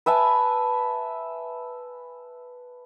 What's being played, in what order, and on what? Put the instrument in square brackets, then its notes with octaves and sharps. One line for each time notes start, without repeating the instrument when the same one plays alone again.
[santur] B4 E5 G#5 A5